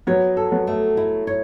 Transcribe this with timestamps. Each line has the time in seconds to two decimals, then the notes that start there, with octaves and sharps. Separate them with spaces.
0.07 F#3 B3 C#5
0.37 A4
0.52 F#3 B3
0.67 A3
0.97 E4
1.27 C#5